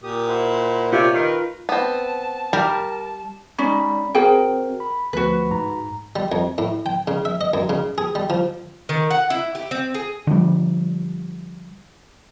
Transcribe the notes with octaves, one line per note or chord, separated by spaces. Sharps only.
A#2 G4 D#6
E4 C5 F#5
C3 F4 C#5 D5
D#3 A#4 B4
B3 C4 A5
G3 A#4
G#3 C#4 D#4 D5 B5
C4 F#4 G#4 A#4 C5 G5
B5
D2 F3 F#4 B4
G#2 A#5
G3
F2
A2
G5
C#3
E5
D#5
F#2
C#3
G#4
G3
F3
D#3
F#5
E4
G4
C4
G#4
D3 F3 G3